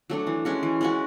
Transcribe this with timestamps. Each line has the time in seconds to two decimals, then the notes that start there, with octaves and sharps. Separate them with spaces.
0.10 F#3 A3 D4
0.27 E3
0.45 G#3 C#4 F#4
0.63 E3
0.81 G#3 C#4 F#4